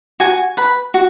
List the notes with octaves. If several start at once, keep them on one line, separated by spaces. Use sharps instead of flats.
F#4 G#5
B4 B5
F#4